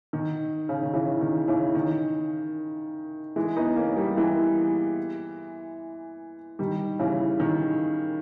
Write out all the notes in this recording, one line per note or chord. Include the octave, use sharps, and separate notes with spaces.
D#3
C#3
D#3
C#3 E3
D#3
C#3 E3
D#3
E3 G#3
B3 D#4
A#3 C#4
G3 A#3
E3 G#3
D#3 G3
C#3 E3
D#3